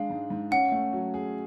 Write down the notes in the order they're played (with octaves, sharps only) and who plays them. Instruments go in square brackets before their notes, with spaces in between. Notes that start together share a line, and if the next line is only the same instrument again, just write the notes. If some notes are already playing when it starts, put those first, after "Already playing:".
Already playing: [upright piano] G#3 D4 [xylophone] F5
[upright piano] G#2
G#2
[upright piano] C#4 [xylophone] F#5
[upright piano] A3
F#3
G#4